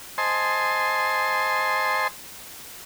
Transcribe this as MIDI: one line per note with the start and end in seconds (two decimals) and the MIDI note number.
0.18 2.08 72
0.18 2.08 75
0.18 2.08 80
0.18 2.08 81
0.18 2.08 84